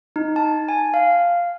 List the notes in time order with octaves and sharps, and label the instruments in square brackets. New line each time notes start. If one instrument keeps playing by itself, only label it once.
[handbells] D#4
A5
G#5
F5